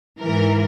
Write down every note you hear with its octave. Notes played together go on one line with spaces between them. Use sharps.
G#2 E3 A#4